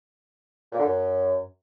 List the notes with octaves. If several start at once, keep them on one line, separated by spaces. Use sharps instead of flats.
A#2
D3
F#2